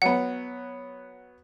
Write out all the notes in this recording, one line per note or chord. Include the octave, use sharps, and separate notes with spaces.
F#3 B3 F#5